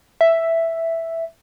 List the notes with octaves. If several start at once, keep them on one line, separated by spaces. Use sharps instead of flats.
E5